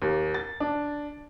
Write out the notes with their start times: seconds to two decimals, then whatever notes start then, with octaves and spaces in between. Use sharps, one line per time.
0.02 D#2
0.34 A6
0.60 D4